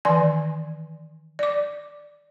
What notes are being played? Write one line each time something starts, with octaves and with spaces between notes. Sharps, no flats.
D#3 E3 D5 G#5
D5 D6